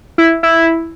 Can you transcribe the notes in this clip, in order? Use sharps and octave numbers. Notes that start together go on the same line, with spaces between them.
E4
E4